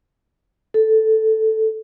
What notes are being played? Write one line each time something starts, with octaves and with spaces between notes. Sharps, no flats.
A4